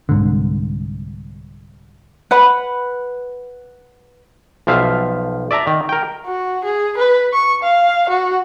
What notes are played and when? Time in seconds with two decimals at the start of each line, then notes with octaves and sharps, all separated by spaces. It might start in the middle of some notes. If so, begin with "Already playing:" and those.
0.09 C2 G#2 D3
2.31 B4 F#5 B5
4.67 B1 F3 E5 F5
5.51 D5 E5 A5 A#5
5.67 D#3
5.89 A#4 G5
6.26 F#4
6.64 G#4
6.98 B4
7.33 C#6
7.63 F5
8.09 F#4